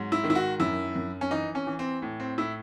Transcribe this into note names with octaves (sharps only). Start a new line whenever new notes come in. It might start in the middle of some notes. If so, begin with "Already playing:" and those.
Already playing: G#2 F#3
E4
D#3
E4
F#4
F#2 E4
F#2
C#4
E3 D#4
C#4
E3
C4
A2
C4
A2 E4